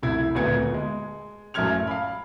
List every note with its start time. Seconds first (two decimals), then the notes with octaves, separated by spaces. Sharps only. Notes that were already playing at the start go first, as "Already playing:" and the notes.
0.02 F1 C2 E4 G#6
0.35 G#1 D2 A#2 B3 G#6 C#7
0.74 G#3
1.54 A1 F#2 E5 F6 G#6 F7
1.87 F5 B5